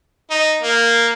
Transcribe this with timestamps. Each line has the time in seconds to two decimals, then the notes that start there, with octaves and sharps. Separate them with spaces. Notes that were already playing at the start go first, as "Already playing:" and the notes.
0.31 D#4
0.62 A#3